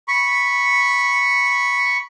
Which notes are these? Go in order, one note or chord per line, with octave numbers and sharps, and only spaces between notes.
B5 C#6